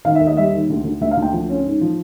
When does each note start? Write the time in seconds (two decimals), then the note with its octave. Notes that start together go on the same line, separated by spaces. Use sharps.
0.05 D#3 F5
0.15 E5
0.20 D#2
0.27 D#5
0.37 G3 E5
0.53 D#2
0.70 D2
0.84 D2
1.01 D2 E5
1.11 F5
1.17 D2
1.22 G5
1.33 F3
1.49 C#4
1.65 G#2
1.81 F3